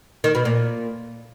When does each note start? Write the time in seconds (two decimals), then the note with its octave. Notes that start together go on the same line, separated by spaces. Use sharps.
0.24 D#3
0.35 B2
0.45 A#2